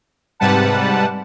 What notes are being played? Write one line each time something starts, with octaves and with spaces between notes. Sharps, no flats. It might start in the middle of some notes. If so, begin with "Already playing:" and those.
G#2 C3 G3 B4 F#5 A5